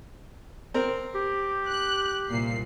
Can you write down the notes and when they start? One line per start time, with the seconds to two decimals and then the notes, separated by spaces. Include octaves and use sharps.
0.74 C4 A#4
1.15 G4
1.68 F#6
2.29 C2 A#2 C7